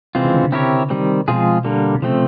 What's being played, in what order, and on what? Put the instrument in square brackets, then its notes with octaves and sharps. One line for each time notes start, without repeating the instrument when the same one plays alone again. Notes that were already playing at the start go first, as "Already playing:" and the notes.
[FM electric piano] C3 [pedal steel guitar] E3 G#3 C4 F4
[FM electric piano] C#3
D3
C3
[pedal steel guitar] C4 E4 G4 A#4 C#5
D#3 G3 C4
[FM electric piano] B2 [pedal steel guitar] F3 G#3 C4 F4 G#4
[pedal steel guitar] D3 G3 A#3
[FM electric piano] C3
[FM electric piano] C#3 [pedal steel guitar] F3 A3 C4